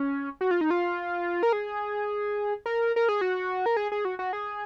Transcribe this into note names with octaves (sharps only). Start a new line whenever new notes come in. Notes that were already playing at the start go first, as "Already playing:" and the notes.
Already playing: C#4
F#4
F4
D#4
F4
A#4
G#4
A#4
A#4
G#4
F#4
A#4
G#4
G#4
F#4
F#4
G#4